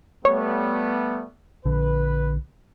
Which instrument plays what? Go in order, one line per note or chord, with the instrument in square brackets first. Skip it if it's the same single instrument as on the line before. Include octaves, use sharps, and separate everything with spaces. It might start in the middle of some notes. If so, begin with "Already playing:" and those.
[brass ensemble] G3 A3 B3 [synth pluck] C#5
[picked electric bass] A#1 D3 [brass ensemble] B4